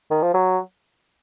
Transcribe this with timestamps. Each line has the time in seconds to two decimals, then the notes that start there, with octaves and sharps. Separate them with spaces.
0.11 D#3
0.23 F3
0.34 F#3